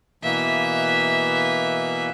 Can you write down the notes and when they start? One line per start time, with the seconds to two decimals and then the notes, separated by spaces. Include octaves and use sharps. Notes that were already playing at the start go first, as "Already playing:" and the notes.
0.23 B2 E3 A#3 E5